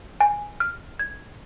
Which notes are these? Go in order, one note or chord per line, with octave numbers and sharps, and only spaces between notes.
G#5
F6
G#6